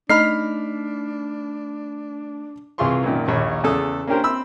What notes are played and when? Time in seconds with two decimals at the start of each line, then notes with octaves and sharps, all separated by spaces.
0.10 A3 D4 D#4 B5 F6 C7
2.78 C2 E3 F4 G#4 C6 C#6
3.04 F#2 A#2 D#3
3.28 A#1 D#2 C#5 B5
3.64 E2 C#3 A4 D#6
4.07 A#3 C#4 D4 G4 A#4 C5
4.23 C4 B5 E6